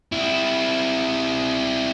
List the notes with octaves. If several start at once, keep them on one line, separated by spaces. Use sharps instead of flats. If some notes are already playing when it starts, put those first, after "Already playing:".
C4 E4